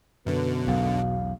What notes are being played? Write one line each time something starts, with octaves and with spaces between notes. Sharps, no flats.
F#2 B2 D3 B4
B1 E2 F5